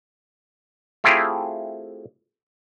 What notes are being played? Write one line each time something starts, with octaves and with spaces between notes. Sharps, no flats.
A3 C4 E4 F4 G4 G#4